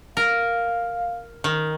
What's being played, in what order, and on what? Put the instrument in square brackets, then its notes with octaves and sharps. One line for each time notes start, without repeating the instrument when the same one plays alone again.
[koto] A#4 [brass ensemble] F5
[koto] D#3